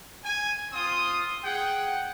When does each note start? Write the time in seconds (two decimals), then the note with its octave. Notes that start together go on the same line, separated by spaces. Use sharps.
0.24 G#5
0.73 C4 F4 C6 D#6
1.44 G#4 F#5 G5